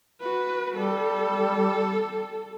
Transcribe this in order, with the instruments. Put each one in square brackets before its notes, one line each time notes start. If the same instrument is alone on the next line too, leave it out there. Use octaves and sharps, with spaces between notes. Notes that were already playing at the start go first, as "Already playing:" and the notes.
[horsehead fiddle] F#4 B4
[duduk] G3 [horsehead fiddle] A4